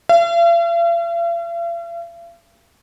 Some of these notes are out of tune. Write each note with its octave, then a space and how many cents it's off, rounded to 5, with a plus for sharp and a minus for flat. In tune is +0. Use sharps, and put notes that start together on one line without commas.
F5 -45